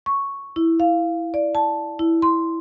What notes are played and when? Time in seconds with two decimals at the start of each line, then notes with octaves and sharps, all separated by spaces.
0.06 C#6
0.56 E4
0.80 F5
1.34 D5
1.55 A5
1.99 E4
2.22 C6